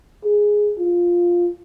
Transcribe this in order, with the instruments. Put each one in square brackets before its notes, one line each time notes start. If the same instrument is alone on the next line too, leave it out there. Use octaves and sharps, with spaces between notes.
[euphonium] G#4
F4